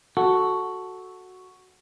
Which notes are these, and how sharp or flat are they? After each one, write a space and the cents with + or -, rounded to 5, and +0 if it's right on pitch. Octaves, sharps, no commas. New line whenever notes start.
F#4 +0 A4 +0